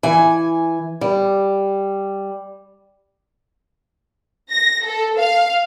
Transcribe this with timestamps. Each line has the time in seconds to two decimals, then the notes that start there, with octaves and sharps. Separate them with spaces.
0.03 E3 G#5
1.01 G3
4.50 A#6
4.85 A4
5.18 F5